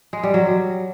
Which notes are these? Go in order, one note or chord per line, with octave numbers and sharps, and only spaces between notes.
G#3
G3
F#3